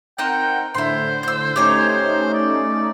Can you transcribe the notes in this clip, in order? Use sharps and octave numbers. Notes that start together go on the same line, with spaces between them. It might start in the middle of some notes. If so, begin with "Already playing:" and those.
C4 D#4 A#4 F#5 G5 F#6
A2 D3 E4 C5 C6
E6 G6
A3 C#4 D#4 G4 C#5 A#5
C5
D5